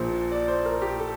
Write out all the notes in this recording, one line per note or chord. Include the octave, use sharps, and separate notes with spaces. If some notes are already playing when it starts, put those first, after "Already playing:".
Already playing: A#1 A#2 F3 C5
D5
C5
A#4
G4
A4